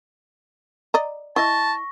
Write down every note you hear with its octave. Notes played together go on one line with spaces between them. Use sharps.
D5 D#5 A#5
E4 D#5 E5 A5 C#6 A#6